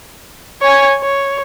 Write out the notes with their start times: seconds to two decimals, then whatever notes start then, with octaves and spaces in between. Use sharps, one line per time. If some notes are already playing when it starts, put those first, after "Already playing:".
0.62 C#5 G#5
1.00 C#5